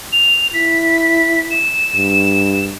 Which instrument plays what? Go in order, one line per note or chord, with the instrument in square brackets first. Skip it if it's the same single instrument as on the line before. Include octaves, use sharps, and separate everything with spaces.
[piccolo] F7
[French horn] E4 [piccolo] B6
[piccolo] E7
[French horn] G2